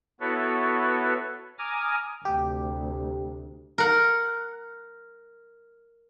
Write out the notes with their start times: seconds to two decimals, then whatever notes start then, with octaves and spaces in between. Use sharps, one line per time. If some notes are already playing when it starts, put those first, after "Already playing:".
0.20 B3 E4 F#4 A4 B4 C#5
1.59 G#5 A#5 D6 D#6 F6
2.25 D2 C3 G4
3.78 A#4 F#5